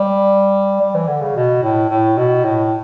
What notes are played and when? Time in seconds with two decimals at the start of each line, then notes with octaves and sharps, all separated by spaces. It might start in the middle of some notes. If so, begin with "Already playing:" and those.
Already playing: G3
0.81 G3
0.95 E3
1.08 D3
1.22 C#3
1.36 B2
1.63 A2
1.90 A2
2.17 B2
2.44 A2